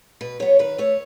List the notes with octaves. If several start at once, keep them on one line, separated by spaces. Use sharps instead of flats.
B2 B4
F#3 B3 C#5
D#3 B4
A3 C#5